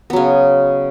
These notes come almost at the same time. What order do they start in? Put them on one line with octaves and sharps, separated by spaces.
B3 F#3 C#3